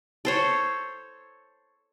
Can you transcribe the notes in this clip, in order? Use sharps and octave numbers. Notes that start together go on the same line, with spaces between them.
A4 C5 C#5